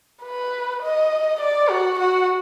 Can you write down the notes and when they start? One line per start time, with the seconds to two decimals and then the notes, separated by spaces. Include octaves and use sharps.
0.24 B4
0.82 D#5
1.41 D5
1.70 F#4
1.99 F#4